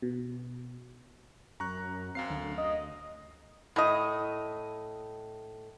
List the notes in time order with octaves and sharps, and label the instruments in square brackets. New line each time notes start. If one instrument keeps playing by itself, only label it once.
[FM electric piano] B2
[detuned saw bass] F#2 [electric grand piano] A#5 C#6 F#6
[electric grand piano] F#2 F5 C7 [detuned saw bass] C4
[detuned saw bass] D2 [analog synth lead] D3
[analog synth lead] D#5
[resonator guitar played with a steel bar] A2 D#5